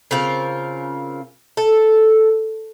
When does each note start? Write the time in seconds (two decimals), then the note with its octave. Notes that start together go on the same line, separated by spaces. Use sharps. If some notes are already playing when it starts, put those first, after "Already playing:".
0.11 C#3 C4 F4 A#4
1.57 A4